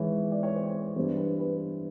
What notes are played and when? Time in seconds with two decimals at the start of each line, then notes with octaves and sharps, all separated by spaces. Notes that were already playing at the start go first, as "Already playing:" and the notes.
Already playing: G#2 E3 C#5
0.32 D5
0.43 C#5
0.55 C5
0.66 C#5
0.96 G2 E3 C5
1.17 B4
1.39 B4